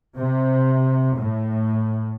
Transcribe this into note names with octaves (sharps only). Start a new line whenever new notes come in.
C3
A2